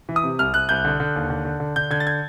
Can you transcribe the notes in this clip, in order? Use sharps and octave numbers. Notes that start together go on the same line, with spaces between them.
E3
D#6
C3
C2 F6
C2 F#6
C2 G6
D3
D3
D#2
D3
D3
D3
D3 G6
D3 G#6
A6
G#6